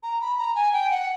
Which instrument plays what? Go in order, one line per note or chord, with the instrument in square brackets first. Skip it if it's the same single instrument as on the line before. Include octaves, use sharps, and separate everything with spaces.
[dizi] A#5
B5
A#5
G#5
G5
F#5